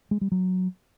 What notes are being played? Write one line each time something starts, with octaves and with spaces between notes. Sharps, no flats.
G#3
G3
F#3